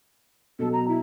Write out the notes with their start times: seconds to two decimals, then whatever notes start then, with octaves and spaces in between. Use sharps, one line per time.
0.59 B2 F#3 A4
0.72 A#5
0.88 E4